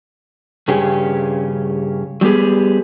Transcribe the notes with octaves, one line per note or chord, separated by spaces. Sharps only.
G2 C#3 C#4 G4 G#4
F#3 G3 B3 G4 G#4